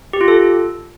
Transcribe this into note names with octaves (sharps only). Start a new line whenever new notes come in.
G4
F4
A4